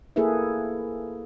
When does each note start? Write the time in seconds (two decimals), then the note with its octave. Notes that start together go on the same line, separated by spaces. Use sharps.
0.16 A#3 E4 G#4 A4 B4 E5